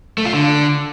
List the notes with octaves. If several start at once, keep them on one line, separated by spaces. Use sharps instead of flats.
A3
F4
D3